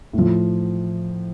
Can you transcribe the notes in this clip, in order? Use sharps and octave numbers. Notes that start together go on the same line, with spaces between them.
A2 F3